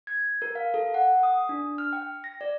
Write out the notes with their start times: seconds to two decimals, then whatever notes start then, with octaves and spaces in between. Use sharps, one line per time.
0.07 G#6
0.42 A#4
0.55 F5
0.74 A4
0.94 F#5
1.23 D#6
1.49 D4
1.78 F6
1.93 G5
2.24 A#6
2.41 D5